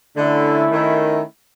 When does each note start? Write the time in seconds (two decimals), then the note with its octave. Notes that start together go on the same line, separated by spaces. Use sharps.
0.16 D3 A3 C#4 E4
0.72 D#3